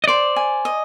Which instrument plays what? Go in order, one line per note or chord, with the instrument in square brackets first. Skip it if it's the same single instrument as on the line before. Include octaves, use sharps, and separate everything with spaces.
[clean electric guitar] D#5
[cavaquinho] C5 [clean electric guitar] D5
[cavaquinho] G#5
D#5